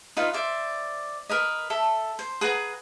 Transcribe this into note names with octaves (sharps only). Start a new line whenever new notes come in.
D#4 F4 B4 F5
C5 D5 E5
A#4 B4 D#5
A4 E5
C5
G#4 B4 F#5 A#5